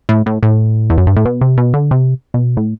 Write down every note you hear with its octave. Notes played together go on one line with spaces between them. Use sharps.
A2
A2
A2
E2
F#2
G2
A2
B2
C3
B2
D3
C3
B2
A2